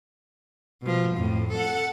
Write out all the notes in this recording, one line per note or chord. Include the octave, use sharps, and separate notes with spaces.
B2 F3
F2 A2
A4 F#5